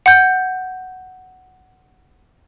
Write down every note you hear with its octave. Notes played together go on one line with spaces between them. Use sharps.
F#5 G6